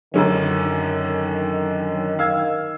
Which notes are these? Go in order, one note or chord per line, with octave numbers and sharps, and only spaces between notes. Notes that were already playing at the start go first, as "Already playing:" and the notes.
F#2 D3 D#3 F#3 C#4
F5 E6 G#6